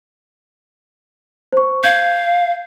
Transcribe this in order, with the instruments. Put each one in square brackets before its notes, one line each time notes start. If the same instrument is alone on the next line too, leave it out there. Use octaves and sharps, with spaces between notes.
[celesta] C5 C#6
[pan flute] F5 [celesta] G6 G#6